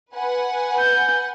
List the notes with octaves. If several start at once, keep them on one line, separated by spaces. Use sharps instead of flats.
B4 F#5 G#5
G6